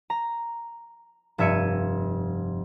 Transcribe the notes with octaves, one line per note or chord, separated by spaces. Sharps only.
A#5
F1 G2 E5 G#6 C#7 D#7